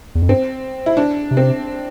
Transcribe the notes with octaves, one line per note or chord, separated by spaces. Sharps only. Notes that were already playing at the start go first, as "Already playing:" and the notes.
E2
F2
G2 C4
E4
D4
C3
C4